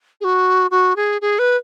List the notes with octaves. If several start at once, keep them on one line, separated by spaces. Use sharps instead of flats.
G#4
F#4
F#4
G#4
G#4
B4